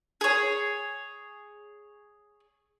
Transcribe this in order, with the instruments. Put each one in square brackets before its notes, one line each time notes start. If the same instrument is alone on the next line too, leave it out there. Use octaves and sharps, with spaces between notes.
[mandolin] G#4 C#5